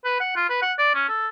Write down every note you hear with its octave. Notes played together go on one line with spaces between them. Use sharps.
B4
F#5
F4
B4
F#5
D5
C#4
A4